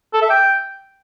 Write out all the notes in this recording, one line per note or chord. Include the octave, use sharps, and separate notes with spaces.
A4
E5
G5